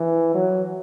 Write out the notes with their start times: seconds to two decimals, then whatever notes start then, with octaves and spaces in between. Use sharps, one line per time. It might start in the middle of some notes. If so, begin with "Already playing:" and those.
Already playing: E3
0.34 F#3